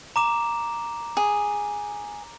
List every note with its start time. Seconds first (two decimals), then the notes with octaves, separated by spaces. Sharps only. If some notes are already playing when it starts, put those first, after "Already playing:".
0.16 A#5 D6 E7
1.17 G#4